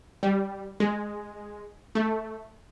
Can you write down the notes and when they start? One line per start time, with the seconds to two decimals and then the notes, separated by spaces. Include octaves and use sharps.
0.23 G3
0.80 G#3
1.95 A3